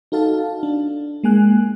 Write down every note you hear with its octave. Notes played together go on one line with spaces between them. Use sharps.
D#4 F#4 A4 F5 A5
D4
G#3 A#3 G#5 F#6